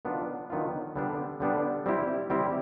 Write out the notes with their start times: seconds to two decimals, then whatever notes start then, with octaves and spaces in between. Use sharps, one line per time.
0.05 D#3 F#3 B3 D4 F4
0.50 D#3 F#3 B3 D4 F4
0.96 D3 G3 B3 D4
1.40 D3 G3 B3 D4
1.86 G3 C4 E4 G4
2.30 G3 C4 E4 G4